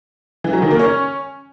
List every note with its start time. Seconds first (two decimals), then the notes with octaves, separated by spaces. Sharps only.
0.44 E3
0.53 F#3
0.62 D#3
0.71 A#3
0.79 C#4